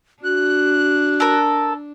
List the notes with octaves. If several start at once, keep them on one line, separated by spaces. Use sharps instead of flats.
D4 F#4 F#6
A4 A#4